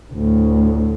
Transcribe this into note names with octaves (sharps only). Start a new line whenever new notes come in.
D2 A2